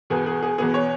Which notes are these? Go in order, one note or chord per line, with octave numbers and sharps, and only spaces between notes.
E2 B2 B3 G#4
G#4
G#4
E2 B2 B3 G#4
C#5